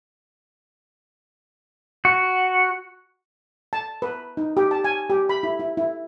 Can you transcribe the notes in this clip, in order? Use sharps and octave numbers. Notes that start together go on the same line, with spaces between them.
F#4
A5
B4
D#4
G4
A5
G#5
G4
B5
E4
E4
E4